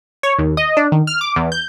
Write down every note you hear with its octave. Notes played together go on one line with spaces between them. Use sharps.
C#5
D#2
D#5
D4
D#3
F6
D6
E2
G6